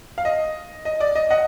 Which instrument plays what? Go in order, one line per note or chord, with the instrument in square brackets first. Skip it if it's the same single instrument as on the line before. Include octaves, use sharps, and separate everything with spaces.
[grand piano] F5
D#5
D#5
D5
D#5
D#5 F#5